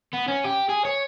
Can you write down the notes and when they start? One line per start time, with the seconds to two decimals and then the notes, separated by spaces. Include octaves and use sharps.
0.13 B3
0.28 C#4
0.44 G4
0.69 G#4
0.85 C#5